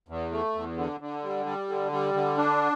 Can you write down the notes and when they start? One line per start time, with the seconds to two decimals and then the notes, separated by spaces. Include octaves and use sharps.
0.09 E2
0.32 A3
0.55 E2
0.77 D3
1.00 D3
1.23 G3
1.46 G3
1.69 D3
1.92 G3
2.14 D3
2.37 D4